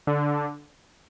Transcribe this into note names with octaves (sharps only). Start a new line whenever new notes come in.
D3